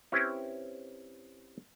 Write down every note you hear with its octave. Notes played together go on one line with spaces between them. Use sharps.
C4 C#4 E4 G4 B4